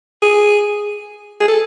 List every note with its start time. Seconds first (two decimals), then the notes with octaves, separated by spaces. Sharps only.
0.22 G#4
1.40 G#4
1.48 A4